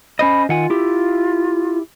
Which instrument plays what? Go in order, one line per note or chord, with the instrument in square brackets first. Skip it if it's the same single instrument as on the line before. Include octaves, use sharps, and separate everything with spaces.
[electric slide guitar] C#4 C5 D#5 [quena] B5
[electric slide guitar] D#3 F#5 G#5 [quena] F4
[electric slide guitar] E4 G4